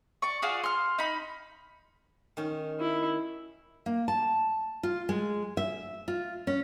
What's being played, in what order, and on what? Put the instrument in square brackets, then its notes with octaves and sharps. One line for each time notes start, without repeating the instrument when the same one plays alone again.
[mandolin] D5 C#6
F4 F#4 G#4 D5
C6 F6
D#4 B5
[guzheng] D#3 C#4
[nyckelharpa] E4
[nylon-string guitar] A#3
A5
F4
G#3
E5
F4
C#4